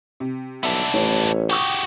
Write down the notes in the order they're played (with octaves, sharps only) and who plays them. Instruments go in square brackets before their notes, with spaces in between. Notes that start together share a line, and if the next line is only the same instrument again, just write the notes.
[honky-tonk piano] C3
[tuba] B1 [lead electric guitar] B3 D4 [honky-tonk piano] E5
[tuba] A1 [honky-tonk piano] A3 C#4 E4
[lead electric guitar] F#4 G4 [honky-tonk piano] G5 C#6 D#6